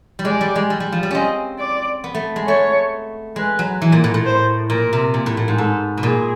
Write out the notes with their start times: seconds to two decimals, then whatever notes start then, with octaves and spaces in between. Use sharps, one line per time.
0.19 G3
0.25 G#3 D5
0.41 G3
0.56 G#3
0.70 G3
0.80 G3
0.92 F3
1.03 G3
1.11 C4 C#4 D#5
1.59 D5
2.04 B3
2.14 A3
2.36 G#3
2.48 A3 C#5
3.36 G#3 B4
3.59 F#3
3.82 E3
3.92 A#2
4.04 A2
4.14 A2
4.26 C5
4.70 A#2 A#4
4.93 C3
5.14 A#2
5.26 A2
5.37 A2
5.48 G#2
5.58 G#2 A4
5.97 B2
6.03 A#2 G#4